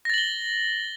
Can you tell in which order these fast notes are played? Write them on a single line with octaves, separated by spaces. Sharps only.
A#6 A6 F#7 G7